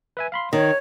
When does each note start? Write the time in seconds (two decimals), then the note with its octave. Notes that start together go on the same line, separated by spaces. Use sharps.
0.17 B4 E5 G#5
0.32 F5 B5 C6
0.53 D#3 C#5 D#5